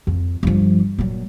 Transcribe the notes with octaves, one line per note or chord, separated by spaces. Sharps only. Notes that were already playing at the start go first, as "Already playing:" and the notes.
F2
G2 F3
A#2 F#3